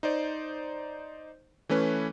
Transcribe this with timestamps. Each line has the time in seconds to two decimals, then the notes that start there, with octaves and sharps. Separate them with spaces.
0.03 D#4 C5 D5
1.69 E3 A3 C#4 B4